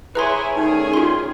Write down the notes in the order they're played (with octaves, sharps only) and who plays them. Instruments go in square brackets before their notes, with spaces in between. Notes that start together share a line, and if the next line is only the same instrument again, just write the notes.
[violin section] E4 C#5 G#5 [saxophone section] G#4 [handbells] B4 A#5 C6
[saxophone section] D#3 G3 A3 [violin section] C#4 G#4 [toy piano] D#4
[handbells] F4 C6